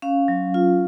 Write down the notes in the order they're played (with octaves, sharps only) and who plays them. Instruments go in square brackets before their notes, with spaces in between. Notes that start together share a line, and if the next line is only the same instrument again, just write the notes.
[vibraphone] C#4 F5
F#3
F4